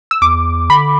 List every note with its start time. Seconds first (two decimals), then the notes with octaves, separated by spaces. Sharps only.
0.11 E6
0.21 E2 D6
0.70 D3 B5